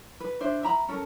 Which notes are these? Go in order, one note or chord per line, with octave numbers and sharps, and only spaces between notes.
B4
D4 C5 E5
E5 A#5 B5
C#4 A4 A#4